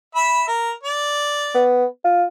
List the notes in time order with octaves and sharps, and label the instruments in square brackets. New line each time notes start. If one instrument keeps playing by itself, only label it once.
[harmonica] E5 B5
A#4
D5
[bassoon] B3
F4